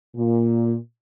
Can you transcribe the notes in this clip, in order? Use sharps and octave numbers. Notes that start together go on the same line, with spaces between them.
A#2